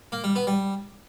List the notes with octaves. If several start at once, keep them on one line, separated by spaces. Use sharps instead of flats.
A#3
G3
B3
G3